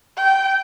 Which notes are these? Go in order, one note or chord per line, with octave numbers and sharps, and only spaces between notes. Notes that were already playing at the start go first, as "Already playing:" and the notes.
G5